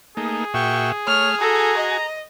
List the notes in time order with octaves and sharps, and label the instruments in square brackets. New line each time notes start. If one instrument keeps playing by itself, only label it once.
[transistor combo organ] A3 A#3 D#4 [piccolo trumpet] G#4
[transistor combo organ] A#2 F#4 E5 [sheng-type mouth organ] G5 C#6
[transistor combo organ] A3 [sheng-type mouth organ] C#5 [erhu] F6
[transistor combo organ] F#4 G#5 [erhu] A4 [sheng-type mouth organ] A#5
[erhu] D#5